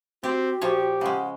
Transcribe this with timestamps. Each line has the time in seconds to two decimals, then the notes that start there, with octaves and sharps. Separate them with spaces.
0.23 C4 F#4 G4
0.61 A#2 F3 G4 C#5
1.01 C#3 G#3 F#5